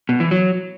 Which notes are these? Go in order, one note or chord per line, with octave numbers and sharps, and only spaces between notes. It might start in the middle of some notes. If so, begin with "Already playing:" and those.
B2
E3
F#3